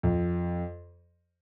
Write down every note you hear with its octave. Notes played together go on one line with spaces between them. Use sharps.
F2